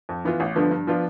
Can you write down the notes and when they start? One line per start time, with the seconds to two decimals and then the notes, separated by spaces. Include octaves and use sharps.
0.09 F2
0.25 E3 B3 F4
0.40 A1
0.56 G2 D3 F3 B3
0.71 G2
0.87 F3 B3 D4 F4